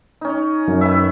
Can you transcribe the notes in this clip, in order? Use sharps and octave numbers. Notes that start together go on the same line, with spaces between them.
C#4 D#4
F#2
D#3 B4 E5